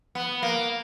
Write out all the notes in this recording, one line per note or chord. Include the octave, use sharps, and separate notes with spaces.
B3
A#3